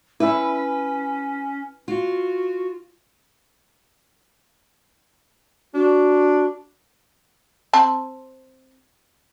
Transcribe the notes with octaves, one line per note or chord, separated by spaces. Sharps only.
C#4 E4 B4 E5
F4 F#4
D4 F#4
C4 A5 B5